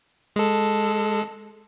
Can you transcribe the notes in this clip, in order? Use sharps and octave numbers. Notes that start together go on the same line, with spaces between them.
G#3 A4